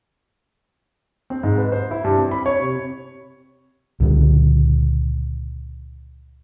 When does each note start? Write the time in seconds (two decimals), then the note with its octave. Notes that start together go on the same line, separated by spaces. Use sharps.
1.30 C4
1.43 G#2
1.58 B4
1.72 C5
1.91 E4
2.04 G2
2.17 C4
2.31 B5
2.46 C#5
2.60 C3
4.00 C#2 A#2 D3 G3